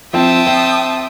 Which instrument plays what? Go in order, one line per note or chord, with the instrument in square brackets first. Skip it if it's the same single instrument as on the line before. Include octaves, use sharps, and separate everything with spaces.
[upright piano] F3 C4 [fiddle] E5 A5 [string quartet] G5 D#6
[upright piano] C4